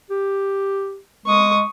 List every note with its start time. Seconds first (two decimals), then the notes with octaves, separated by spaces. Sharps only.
0.10 G4
1.26 G#3 C#6 D#6